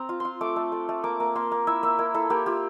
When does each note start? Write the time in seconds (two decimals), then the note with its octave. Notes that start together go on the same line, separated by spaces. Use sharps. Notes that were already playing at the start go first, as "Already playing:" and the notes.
Already playing: C4 A#5
0.09 F4
0.20 F4 C6
0.41 A3 D6
0.56 A3
0.72 A3
0.89 A3
1.04 A#3 D6
1.20 A#3
1.35 A#3 C6
1.52 A#3
1.67 E4 E5
1.83 A#3 E5
1.99 E4 A#4
2.14 E4 A4
2.30 A#3 G4
2.46 F4 G4